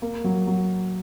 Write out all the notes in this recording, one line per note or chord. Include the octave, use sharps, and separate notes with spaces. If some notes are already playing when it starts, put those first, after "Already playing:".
A#3
F#3
F#3